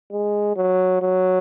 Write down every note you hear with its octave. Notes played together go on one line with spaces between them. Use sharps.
G#3
F#3
F#3